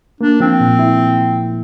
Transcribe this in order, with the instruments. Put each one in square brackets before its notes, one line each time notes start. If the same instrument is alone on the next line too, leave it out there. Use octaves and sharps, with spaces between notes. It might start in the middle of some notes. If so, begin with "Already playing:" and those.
[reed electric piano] A#3 [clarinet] D4
[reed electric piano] F3 [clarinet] C4
[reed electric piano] A#2
E4